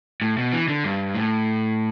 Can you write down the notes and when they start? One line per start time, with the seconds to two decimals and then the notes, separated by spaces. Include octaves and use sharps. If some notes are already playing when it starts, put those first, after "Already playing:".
0.22 A2
0.38 B2
0.53 E3
0.68 D3
0.84 G2
1.15 A2